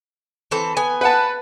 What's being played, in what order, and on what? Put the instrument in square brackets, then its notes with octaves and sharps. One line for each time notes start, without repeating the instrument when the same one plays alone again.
[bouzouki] E3 C4 A4
B3 G#5
[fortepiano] B4 F#5 A5